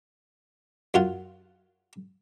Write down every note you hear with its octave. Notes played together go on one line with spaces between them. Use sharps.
F#2 F4 F#5